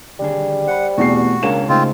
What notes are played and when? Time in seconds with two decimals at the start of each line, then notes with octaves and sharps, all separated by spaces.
0.20 D#2 D3 G3 G#4
0.68 C5 F#5 B5
0.98 E2 B2 A3 C4 F#4 G4 C7
1.43 C#2 A#3 D4 C#5 G5 E7
1.69 G#2 C#3 A3 C4 D#4 F4